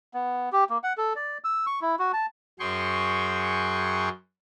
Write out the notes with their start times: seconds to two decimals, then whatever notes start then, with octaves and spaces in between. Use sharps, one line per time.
0.14 B3
0.52 G4
0.70 A#3
0.83 F#5
0.97 A4
1.16 D5
1.44 E6
1.67 C#6
1.81 E4
1.99 F#4
2.13 A5
2.60 F#2 F#3 G#4 G5 C6 C#6